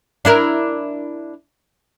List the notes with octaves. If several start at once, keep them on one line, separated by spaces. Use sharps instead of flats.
D4 E4 A#4